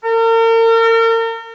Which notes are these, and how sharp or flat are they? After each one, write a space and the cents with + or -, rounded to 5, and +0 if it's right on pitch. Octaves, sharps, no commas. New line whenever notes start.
A#4 -40